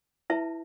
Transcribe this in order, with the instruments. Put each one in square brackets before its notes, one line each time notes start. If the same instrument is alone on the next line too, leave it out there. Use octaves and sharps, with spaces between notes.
[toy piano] E4 B4 E5 A5